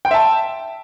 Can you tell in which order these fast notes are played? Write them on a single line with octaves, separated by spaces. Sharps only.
G5 C6 E5 A5